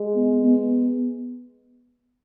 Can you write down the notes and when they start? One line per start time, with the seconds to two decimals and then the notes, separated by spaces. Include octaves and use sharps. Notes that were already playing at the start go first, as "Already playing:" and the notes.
Already playing: G#3
0.16 B3
0.44 B3